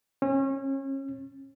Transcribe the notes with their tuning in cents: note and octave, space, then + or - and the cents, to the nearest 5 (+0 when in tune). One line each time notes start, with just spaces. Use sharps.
C#4 -30